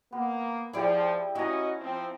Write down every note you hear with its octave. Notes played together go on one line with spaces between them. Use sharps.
A#3 B3
F3 E4 G4 G#4 D5
C#4 E4 F#4 D#5 G#5 A#5
F3 C4